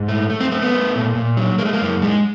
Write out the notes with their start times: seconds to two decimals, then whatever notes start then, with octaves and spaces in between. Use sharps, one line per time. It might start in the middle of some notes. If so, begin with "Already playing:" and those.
Already playing: G#2
0.08 A3
0.30 A3
0.40 C4
0.52 A3 C4
0.62 B3
0.72 A3
0.95 A#2
1.15 A#2
1.37 F#3
1.58 G#3 A#3
1.65 A3
1.73 A#3
1.81 F#2
2.02 G#3